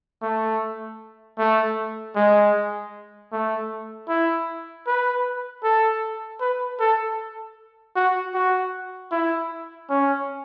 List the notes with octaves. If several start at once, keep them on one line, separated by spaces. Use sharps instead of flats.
A3
A3
G#3
A3
E4
B4
A4
B4
A4
F#4
F#4
E4
C#4